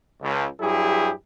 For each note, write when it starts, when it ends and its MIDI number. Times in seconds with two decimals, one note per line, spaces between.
0.22 0.46 37
0.61 1.11 43
0.61 1.11 54
0.61 1.11 64
0.61 1.11 67
0.61 1.11 68